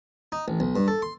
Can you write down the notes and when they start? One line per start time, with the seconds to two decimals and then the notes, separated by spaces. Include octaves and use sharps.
0.32 D#4
0.48 A1
0.60 B1
0.76 G2
0.88 A4
1.02 C6